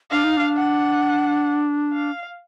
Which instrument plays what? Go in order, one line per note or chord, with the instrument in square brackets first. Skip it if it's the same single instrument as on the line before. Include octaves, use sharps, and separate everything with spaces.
[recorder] D4 [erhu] F5
[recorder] D#4
D4
[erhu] F#5
F5